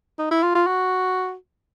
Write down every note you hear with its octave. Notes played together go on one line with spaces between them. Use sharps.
D#4
E4
F4
F4
F#4